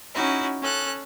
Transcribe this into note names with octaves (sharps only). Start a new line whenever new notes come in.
C#4 D#4 E4 F#4
C#4 A4 F#6